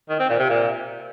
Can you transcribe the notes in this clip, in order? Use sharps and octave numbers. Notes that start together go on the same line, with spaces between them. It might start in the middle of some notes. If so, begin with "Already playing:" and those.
D#3
C4
A#2
C3
A#2